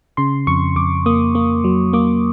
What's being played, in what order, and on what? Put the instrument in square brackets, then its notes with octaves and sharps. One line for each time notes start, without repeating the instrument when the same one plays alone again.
[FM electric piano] C#3 C6
F2 C#6
F2 D6
A#3 D#6
A#3
F#3
A#3 D6